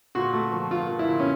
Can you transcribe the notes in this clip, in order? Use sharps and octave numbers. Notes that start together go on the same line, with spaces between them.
A#2 F#4
A3
F3
A#2 F4
F3
E4
A#2
C#4